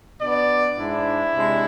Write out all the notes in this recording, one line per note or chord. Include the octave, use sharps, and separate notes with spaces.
B2 B3 D4 D5
G#2 G#3 D4 E4
C3 G#3 D4